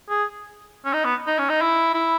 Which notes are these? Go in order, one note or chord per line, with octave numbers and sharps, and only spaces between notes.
G#4
C#4
D#4
B3
D#4
C#4
D#4
E4
E4